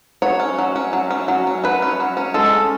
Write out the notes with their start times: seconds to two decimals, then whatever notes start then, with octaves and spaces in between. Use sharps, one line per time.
0.22 F#3 C#5
0.40 C#4
0.59 F#3
0.76 C#4
0.93 F#3
1.11 C#4
1.28 F#3
1.47 C#4
1.64 F#3 B4
1.82 C#4
2.00 F#3
2.17 C#4
2.34 G#3 A4
2.53 C#4